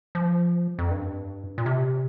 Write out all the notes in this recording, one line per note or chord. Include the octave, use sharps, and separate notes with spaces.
F3
F2
G2
A#2
C3